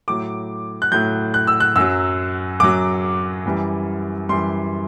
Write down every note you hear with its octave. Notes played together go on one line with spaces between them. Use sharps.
A2 F#3 D6
F#6
A2 F#3 G6
F#6
E6
F#6
F#2 F#3 E6
F#2 F#3 D6
F#2 E3 G3
F#2 E3 G3 C6